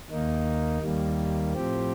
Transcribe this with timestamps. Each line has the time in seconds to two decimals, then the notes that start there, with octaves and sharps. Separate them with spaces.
0.11 D#2 D#3 A#3 D#4
0.82 D#2 D#3 G3 A#3
1.53 A2 F3 C4 G4